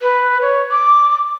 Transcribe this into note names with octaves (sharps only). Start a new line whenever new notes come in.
B4
C#5
D6